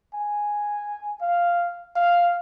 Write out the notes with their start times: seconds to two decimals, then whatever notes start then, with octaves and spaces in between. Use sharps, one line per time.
0.14 G#5
1.21 F5
1.96 F5